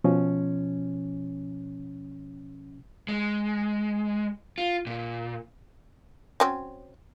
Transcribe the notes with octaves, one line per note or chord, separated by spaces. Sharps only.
B2 F3 C#4
G#3
F4
A#2
F#3 C4 C#4